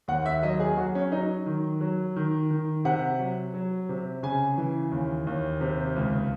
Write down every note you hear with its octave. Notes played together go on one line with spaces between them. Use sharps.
D#2 F#5
E5
F#3 D#5
G#4
F#3 F#4
C#4
F#3 D#4
D#3
F#3
D#3
D#3
C3 F#5
F#3
F#3
C3
C#3 G#5
E3
D#2
D#2
C3
C#2